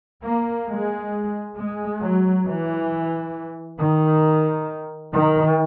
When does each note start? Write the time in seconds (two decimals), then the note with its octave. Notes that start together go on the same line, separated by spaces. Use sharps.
0.24 A#3
0.68 G#3
1.56 G#3
2.01 F#3
2.45 E3
3.78 D#3
5.12 D#3